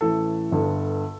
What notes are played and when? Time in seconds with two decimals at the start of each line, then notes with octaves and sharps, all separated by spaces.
0.01 A1 A2 E3 A4
0.51 G1 G2 D3